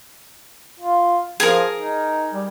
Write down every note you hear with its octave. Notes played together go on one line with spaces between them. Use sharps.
F4
F3 G#4 A#4
D#4
G3